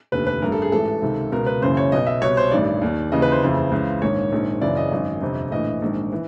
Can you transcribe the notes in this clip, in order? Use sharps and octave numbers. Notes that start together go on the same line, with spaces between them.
F1 D#2 D3 B4
B4
A1 G2 D3 A#4
A4
G#4
A1 G#2 E3 A4
C#2 C3 D#3
C#2 B2 A#4
B4
F#1 F#2 C#3 E3 C5
C#5
B1 B2 D#5
E5
C2 B2 C#5
C5
A1 G2 D#3 D5
D#2 D#3
D#2 C#3 E3 D#5
B4
C5
F#1 F2 C#3 E3
C#2 C#3 E3
A#1 G#2 D#3 C#5
A#1 G#2 D#3
F#1 F#2 C#3 E3 D5
D#5
G#1 F#2 D#3
G1 F2 C3
A#1 A2 E3 D#5
A#1 G#2 D#3
E3